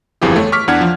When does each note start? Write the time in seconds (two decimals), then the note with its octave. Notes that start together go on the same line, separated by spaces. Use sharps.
0.22 G1 F2 E3 F4 G4 G#4
0.36 A3 C#5
0.52 C#6 D6 F6 B6
0.68 E2 D4 F#5 F6 G#6
0.81 F3